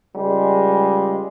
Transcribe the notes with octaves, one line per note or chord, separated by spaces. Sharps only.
C#2 G3 G#3